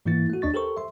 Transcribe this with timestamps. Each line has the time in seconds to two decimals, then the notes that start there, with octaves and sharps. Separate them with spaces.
0.06 G#2 E3 A#3 E4 A6
0.30 A3 F#4
0.42 D#2 D4 D#5 C#6 A6
0.54 G4 A4 A#4 C5 C#6
0.77 E5 C6